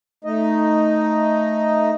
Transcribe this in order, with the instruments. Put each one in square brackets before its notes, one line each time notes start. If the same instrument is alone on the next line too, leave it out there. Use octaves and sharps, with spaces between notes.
[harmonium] A3 D#4 D#5